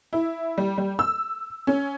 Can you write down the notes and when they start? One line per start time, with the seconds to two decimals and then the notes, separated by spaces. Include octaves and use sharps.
0.13 E4
0.58 G3
0.78 G3
0.99 E6
1.67 C#4